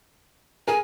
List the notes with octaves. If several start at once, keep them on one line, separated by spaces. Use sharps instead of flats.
G#4 A#4 G#5